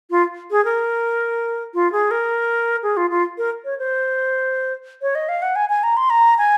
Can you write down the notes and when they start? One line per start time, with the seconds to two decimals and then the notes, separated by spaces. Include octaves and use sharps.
0.11 F4
0.51 G#4
0.65 A#4
1.74 F4
1.92 G#4
2.11 A#4
2.83 G#4
2.97 F4
3.10 F4
3.38 A#4
3.65 C#5
3.79 C5
5.02 C#5
5.15 D#5
5.29 F5
5.42 F#5
5.56 G#5
5.70 G#5
5.83 A#5
5.97 C6
6.10 A#5
6.38 G#5